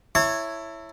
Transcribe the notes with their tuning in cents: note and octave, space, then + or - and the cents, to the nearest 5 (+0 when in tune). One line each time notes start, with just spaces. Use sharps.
E4 +5 C#5 -5 A5 +40